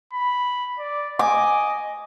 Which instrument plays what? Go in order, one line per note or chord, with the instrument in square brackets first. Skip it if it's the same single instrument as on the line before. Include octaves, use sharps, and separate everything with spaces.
[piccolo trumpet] B5
D5
[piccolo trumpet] D#5 [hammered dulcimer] G#5 D6